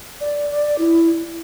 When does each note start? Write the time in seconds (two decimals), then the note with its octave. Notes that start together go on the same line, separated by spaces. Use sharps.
0.21 D5
0.50 D5
0.78 E4